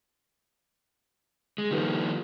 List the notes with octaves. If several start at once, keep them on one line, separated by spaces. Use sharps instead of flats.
G#3
D#3 F3 A#3 G4 A4 B4